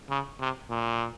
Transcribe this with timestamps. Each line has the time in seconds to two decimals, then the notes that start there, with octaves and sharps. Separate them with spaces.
0.10 C#3
0.40 C3
0.70 A#2